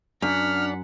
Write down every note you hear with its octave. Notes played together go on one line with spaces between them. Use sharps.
F#2 D4 F#5 F6 B6